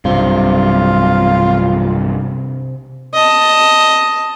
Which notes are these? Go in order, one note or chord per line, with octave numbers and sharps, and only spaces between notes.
B1 G2 C3 C4 F4
D#5 A5